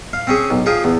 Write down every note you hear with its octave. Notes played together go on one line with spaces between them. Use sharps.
F5
C4 C#4 G#4
B1
F3 G#4 F5 G5
E2